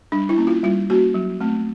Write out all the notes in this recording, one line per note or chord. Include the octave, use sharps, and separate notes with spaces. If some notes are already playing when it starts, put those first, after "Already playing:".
G3 D4
E4
A#3 C#4
F4
G3 F4
A#3 C#4 F#4
F#3
A3 C4